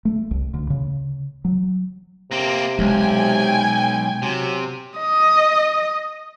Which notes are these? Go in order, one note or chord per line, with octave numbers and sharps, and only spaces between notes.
A3
C2
D2
C#3
F#3
C3 A#3 C4
B1 G#3 G5 G#5
C3 F#3
D#5